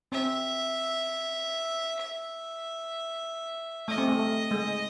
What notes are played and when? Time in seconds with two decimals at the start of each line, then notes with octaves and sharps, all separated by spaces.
0.12 C4 E5
2.00 E5
3.88 A3 D#5
3.98 C4
4.08 A3
4.19 A3
4.51 G#3